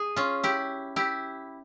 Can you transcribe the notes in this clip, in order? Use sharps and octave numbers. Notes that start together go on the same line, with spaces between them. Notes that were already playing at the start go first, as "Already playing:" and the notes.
Already playing: G#4
C#4 F4
E4 G4
E4 G4